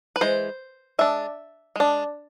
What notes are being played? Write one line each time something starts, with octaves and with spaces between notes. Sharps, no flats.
B4
E3 G#3 C5
G#3 D4 E5
G#3 D4